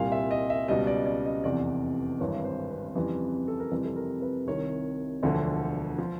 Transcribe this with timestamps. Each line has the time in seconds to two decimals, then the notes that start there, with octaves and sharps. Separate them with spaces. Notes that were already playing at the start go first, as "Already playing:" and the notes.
Already playing: C2 A#2 G3 F5
0.12 E5
0.31 D#5
0.50 E5
0.68 C#2 B2 G3 D#5
0.87 D5
1.06 D5
1.26 D#5
1.44 F1 E2 C3 D5
2.20 G#1 G2 E3 C#5
2.45 C5
2.70 B4
2.95 F2 C#3 E3 G3
3.48 A4
3.60 A#4
3.71 F2 C3 E3 G3 B4
3.85 A4
3.96 A#4
4.22 B4
4.47 C2 C3 D#3 C#5
5.23 E1 D2 D3 F3
5.98 F3